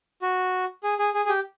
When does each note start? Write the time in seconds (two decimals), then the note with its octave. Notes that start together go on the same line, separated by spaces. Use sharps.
0.22 F#4
0.83 G#4
0.99 G#4
1.14 G#4
1.25 G#4
1.29 G4